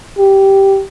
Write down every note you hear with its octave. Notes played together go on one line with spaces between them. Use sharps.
G4